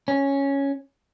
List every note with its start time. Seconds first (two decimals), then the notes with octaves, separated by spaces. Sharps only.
0.08 C#4